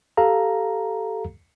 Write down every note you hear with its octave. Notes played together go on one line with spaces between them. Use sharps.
G4 A4 F5 A#5